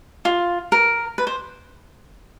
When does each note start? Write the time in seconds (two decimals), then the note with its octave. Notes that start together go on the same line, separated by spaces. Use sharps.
0.25 F4
0.72 A#4
1.18 B4
1.27 C5